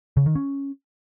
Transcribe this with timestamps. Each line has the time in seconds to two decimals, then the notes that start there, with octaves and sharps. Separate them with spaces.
0.17 C#3
0.26 D#3
0.35 C#4